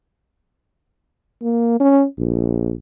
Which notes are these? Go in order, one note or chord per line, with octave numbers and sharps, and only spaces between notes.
A#3
C#4
A#1